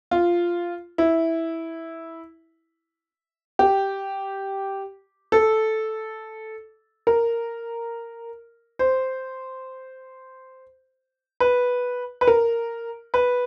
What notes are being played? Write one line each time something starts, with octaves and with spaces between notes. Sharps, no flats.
F4
E4
G4
A4
A#4
C5
B4
B4
A#4
B4